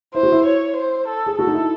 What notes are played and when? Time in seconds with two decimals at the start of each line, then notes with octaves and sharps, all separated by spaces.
0.14 E4 C5
0.23 F#4
0.32 E4
0.46 C#5
0.76 C5
1.08 A4
1.26 G#4
1.38 F#4 A4
1.47 D#4
1.54 E4